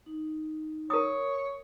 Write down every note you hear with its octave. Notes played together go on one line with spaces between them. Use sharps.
D#4
A#4 C#5 D#6